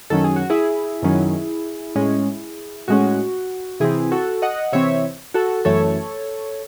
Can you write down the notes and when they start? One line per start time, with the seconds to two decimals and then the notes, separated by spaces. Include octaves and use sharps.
0.10 F#2 D#3 F#3 C#4 A4
0.24 G#4
0.36 F#4
0.50 E4 G#4
1.02 F#2 D#3 F#3 C#4
1.95 A2 G#3 C#4
2.88 A2 G#3 C#4 F#4
3.80 C3 E3 C4 E4 G#4
4.12 F#4 A4
4.42 D#5 F#5
4.72 C3 E3 C4 C#5 E5
5.34 F#4 A4
5.65 F#2 E3 A3 A4 C#5